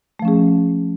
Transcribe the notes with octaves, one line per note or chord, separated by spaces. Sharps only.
F3 A3 C#4 G#4